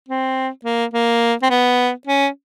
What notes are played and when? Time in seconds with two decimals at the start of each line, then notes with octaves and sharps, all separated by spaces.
0.08 C4
0.65 A#3
0.94 A#3
1.42 C4
1.50 B3
2.07 C#4